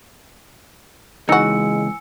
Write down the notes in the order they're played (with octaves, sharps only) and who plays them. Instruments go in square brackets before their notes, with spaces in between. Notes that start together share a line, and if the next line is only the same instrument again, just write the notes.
[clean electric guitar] C#2 E3 [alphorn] G#3 [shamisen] D#4 F#4 [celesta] G#5 E6 C#7